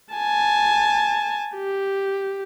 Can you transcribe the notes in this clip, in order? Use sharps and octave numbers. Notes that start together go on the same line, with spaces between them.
G#5 A5
G4